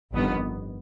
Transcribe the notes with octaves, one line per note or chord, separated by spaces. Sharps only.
G1 F2 D#3 B3